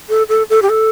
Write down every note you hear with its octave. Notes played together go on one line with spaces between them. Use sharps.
A4
A4
A4
G4
A4